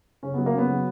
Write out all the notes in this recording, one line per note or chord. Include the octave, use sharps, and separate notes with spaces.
C#3 C#4
F#3 B3
A#3
C#3 B3
F#3